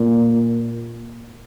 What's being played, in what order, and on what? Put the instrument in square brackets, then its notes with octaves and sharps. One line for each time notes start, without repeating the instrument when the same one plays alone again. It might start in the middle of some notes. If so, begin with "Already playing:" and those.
Already playing: [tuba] A#2